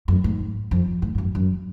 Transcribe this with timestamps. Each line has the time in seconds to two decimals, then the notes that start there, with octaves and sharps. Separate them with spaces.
0.08 F#2
0.24 G#2
0.71 F2
1.02 G#2
1.15 G#2
1.18 F#2
1.35 F#2